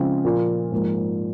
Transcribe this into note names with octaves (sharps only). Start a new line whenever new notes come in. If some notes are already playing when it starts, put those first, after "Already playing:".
Already playing: C#3 F3 G#3 C4
A#2 F3 A#3 F4
G#2 F3 A#3